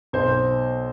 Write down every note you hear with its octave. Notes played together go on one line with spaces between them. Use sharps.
B1 C5